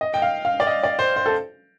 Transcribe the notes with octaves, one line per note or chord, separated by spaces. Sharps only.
D#5
G5
F5
F5
D5
D#5
D5
C5
C5
A4